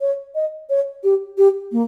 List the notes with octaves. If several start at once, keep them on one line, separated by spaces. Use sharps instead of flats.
C#5
D#5
C#5
G4
G4
A#3